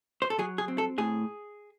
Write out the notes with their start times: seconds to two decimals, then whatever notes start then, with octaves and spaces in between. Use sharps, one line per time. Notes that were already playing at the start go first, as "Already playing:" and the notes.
0.22 C5
0.30 A4
0.39 F#3 G#4
0.58 G#4
0.68 C4
0.78 A4
0.98 A2 G#4